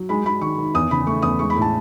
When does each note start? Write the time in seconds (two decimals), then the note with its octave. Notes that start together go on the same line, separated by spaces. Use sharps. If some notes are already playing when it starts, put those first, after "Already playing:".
Already playing: F#3
0.09 G#3 B5
0.25 G#3 B5
0.41 D#3 C#6
0.58 D#3
0.74 E2 D#6
0.91 C#3 B5
1.07 A3 C#6
1.22 E2 D#6
1.39 G#3 C#6
1.50 B5
1.56 A2
1.62 A5